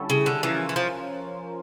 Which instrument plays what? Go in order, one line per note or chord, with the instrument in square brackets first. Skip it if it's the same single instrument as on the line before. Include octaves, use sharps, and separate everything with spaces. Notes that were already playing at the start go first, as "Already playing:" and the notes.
Already playing: [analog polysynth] D3 G3 C#4 E4 A4
[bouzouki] C#3
D3
[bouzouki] E3 [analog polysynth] F3 C#4 F4 A#4
[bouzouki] E3
F3